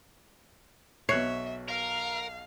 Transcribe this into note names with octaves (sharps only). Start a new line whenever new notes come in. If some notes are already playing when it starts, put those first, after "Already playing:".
B1 C#5 E5 F#6 C7
A#4 F5